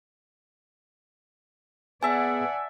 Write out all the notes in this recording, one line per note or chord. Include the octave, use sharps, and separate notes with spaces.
B3 G#4 D5 E5 F#5 G#5 A5